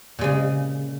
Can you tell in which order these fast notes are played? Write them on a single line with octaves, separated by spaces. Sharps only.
A#2 G#3 C#3